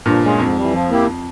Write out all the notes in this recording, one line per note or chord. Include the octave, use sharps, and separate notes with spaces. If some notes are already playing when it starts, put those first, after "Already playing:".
G2 A#2 F3
G#3 C#4 F4 G#4
F2 G#2
E3 G3
F3
A#3 E4 G4
F2